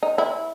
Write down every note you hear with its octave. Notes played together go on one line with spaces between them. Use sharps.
D#4
E4